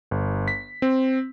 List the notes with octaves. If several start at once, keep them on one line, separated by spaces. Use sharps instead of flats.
G1
B6
C4